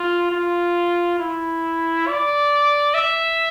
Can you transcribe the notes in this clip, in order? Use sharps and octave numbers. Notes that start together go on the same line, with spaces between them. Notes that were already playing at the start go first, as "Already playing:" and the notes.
Already playing: F4
F4
E4
D5
E5